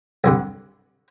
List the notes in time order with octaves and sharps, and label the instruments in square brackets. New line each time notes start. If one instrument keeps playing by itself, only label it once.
[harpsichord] C2 G2 D3